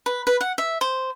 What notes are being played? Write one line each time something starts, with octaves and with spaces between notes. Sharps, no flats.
B4
B4
F#5
E5
C5